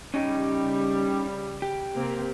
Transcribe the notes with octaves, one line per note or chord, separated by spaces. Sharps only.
C#3 G3 C#4 D#4 G4
G4
C3 A#3 C4